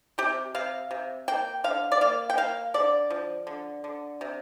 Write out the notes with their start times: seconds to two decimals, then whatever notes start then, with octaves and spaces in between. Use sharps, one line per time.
0.18 C3 G4
0.55 C3 F5
0.91 C3
1.28 A#3 G5
1.64 D3 F5
1.92 D5
2.01 A#3 F5
2.30 G5
2.37 A#3 F5
2.74 D3 D5
3.10 F3
3.47 D3
3.84 D3
4.21 C3